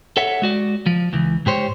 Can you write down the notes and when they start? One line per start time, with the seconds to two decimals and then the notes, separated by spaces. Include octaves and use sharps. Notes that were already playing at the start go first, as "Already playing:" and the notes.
0.17 A4 C#5 E5 F#5
0.42 G#3 F#4 D5
0.86 F3
1.13 C#2 E3
1.46 G#2 G4 C5 C#5